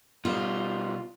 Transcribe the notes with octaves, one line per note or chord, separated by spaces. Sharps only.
B2 G3 F4